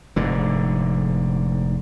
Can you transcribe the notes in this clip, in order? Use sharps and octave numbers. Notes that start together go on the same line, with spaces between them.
F1 G#2 D3